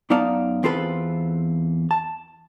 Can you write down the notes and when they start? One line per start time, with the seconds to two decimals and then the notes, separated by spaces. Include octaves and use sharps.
0.10 F#2 B3 D#4 D5 F5 A5
0.63 E2 C4 F4 A4 B4
1.91 A5